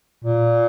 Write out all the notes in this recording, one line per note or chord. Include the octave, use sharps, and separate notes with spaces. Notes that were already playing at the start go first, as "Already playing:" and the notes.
A#2